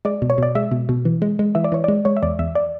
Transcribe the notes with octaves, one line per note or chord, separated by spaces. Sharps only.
G#3 D5
B2
C#5
B2 D5
G#3 E5
B2
B2
E3
G#3
G#3
E3 E5
D5
E3 C#5
G#3 D5
G#3 C#5
E5
E2 D5
E2 E5
D5